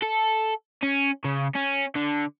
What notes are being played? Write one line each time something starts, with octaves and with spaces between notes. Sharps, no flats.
A4
C#4
C#3
C#4
D3